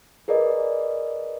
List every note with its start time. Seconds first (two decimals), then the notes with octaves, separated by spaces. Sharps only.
0.28 G#4 A#4 B4 D5 D#5